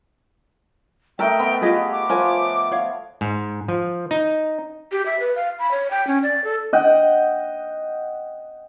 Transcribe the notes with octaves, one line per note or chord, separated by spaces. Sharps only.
A3 A#4 D#5 E5 G5
B3
F4 G4 G#4 D#5
D6
F3 A#4 C#5 G#5
C#5 F5
G#2
F3
D#4
G4
E5
B4
F5
B5
C#5
G5
C#4
D5
A4
D#5 F#5 G5